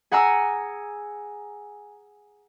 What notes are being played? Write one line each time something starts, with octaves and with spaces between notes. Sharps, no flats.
G#4 F#5 G#5 A#5 E6